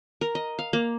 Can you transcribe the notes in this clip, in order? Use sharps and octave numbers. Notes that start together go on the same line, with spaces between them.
A#4
D#5
F5
A#3